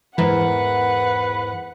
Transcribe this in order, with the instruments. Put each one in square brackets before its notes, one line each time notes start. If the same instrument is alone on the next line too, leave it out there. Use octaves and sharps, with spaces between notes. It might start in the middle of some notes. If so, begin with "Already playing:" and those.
[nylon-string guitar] E2 G#2 A#4 [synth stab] E3 [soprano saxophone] B4 [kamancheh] F#5